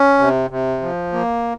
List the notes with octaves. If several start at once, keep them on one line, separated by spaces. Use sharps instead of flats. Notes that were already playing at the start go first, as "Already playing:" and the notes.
Already playing: C#4
C3
C3
F3
A#3